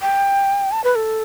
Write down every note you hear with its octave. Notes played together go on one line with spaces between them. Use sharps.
G5
A5
B4
A4